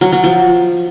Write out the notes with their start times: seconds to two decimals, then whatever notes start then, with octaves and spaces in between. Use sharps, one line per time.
0.01 F#3
0.12 F#3
0.24 F3